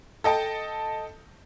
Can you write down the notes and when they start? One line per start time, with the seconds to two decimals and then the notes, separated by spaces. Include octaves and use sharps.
0.24 A4 D#5 G5 A5